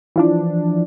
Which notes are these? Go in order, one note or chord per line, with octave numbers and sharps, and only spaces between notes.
E3 F3 D4